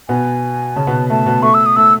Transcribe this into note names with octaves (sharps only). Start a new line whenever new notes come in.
B2 B3 G#5
C#3 C#4 A5
B2 B3
A3 A5
B2 B3
A3 C#6
E6
D#6
A3 E6